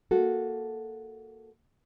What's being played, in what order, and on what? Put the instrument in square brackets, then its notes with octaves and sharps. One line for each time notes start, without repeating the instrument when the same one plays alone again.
[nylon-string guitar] A#3 F#4 A4